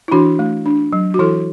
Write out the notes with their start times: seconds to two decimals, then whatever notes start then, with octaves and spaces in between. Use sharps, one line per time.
0.08 E4
0.12 E3 D4 F#4
0.39 A3
0.66 D4
0.93 F#3
1.14 F#4
1.19 E3 E4 A4